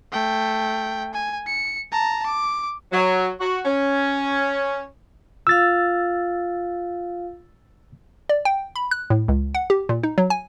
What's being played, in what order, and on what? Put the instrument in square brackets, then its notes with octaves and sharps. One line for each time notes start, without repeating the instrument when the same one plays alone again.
[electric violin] A3 G5
G#5
C#7
A5 A#5
D6
[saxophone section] F#3
F#4
C#4
[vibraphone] F4 F5 [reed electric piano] E6 A6
[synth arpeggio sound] D5
G5
B5
F#6
A2
C#2
F#5
G4
A#2
D#4
F#3
G#5